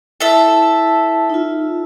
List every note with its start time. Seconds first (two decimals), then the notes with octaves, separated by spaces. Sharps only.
0.20 E4 A4 E5 A5
1.30 D#4 F4